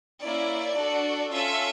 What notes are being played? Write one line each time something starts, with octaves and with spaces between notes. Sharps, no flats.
A#3 C#4 E4 D5
D4 F#4 A4
C#4 F4 A4 E5